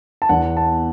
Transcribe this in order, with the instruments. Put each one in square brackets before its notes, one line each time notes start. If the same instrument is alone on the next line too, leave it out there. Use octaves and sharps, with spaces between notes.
[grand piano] A5
E2 F#5
A5